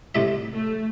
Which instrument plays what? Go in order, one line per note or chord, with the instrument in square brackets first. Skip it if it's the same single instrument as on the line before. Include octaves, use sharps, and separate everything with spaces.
[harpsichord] C2 A2 E5
[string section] A3